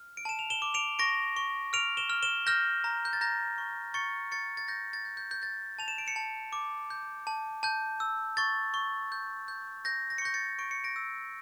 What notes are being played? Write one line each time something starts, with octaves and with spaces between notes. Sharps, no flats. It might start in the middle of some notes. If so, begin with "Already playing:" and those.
Already playing: F6
D7
A5 E7
F7
E7 G7
D6
D7 F7
C#6 A#6 D7
C#6
F6 D7 F7
E7 G7
F6
E7 G7
F6 G6 A#6
A#5
G6
A6
A#5 G6 A#6
C#6
C#6 A6 C#7
C#6 A6 C#7
A6
G6 A#6
A6
G6
G6
G6
G6 A6
A5 F7
E7
D7
C#7 E7
A5
D6
G6
A5
A5 G6
E6
C#6 A6
C#6
G6
G6
G6 A#6
A#6
C#7
C#6 G6 A#6
A6 C#7
C#6 D7
C#7
A#6 D7
E6